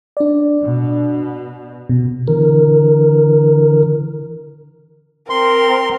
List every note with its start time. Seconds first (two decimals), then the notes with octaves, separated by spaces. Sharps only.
0.17 D4 D5
0.64 B2
1.89 B2
2.28 D3 E3 A#4
5.30 C4 A#4 C6